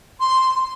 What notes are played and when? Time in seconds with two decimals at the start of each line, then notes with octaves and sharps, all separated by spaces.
0.20 C6